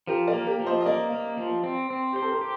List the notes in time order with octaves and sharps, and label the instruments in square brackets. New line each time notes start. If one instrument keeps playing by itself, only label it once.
[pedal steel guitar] F3 [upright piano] G4 A#4
[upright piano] A#4 D5
[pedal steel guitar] A#3
[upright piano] G4 A#4
[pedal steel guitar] F3
[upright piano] C5 D#5
D#5
[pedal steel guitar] A#3 [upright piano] A#4 D5
[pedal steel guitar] A#3
F3
C4
C4
[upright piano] G4 [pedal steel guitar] C5
[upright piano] A4
A#4
[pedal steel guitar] G4